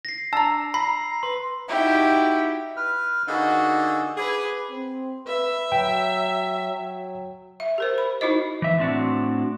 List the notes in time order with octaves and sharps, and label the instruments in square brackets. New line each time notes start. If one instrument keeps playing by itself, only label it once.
[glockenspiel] A#6 C7
[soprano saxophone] D4 [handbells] A5 A#5 [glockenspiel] E6
[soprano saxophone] A#5 [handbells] B5 [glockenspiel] C7
[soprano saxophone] B4 [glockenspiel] C6
[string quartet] D#4 E4 F#4 G4
[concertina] B4 F6
[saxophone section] D3 A#3 D#4 [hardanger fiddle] F#4 [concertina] G#4 E6
[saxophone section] G#4 [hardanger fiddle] B4 [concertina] D6
[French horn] C4
[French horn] B4 [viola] E5
[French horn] F#3 [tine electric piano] G5
[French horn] F#3
[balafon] E5
G4 A#4 C5
B5
D#4 E4 F#4 C5 D#5
[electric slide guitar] E3 E5
A2 C4 D4 F#4